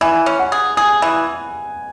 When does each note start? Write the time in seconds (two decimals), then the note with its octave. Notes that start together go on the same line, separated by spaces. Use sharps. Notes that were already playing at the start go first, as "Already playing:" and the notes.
0.01 E3 G#5
0.26 C#4
0.39 F#5
0.52 G#4
0.77 G#4 G#5
1.02 E3